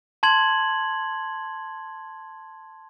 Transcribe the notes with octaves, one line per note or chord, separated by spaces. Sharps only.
A5 C6 G#6 F#7